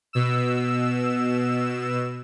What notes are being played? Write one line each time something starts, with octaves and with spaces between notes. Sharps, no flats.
B2 E6